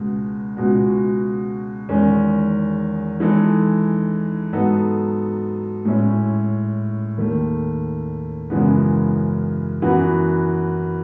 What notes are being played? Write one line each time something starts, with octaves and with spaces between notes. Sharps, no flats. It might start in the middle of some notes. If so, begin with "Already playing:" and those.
Already playing: C#2 B2 G#3 B3
C#2 B2 G#3 B3 F#4
E2 D#3 G#3 C#4
E3 G#3 D#4 A4
G#2 F#3 B3 D#4 A4
A2 G#3 C#4 E4
D#2 D#3 A3
F#2 C#3 E3 G#3 B3
F#2 E3 B3 F#4 B4